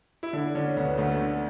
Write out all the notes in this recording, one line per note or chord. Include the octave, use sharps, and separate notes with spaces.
E4
D3 D4
D3 C#4
D2 B3
D2 A3
D3